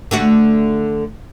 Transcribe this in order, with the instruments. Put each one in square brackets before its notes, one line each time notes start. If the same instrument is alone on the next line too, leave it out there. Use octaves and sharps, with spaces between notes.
[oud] D3 A3 F#4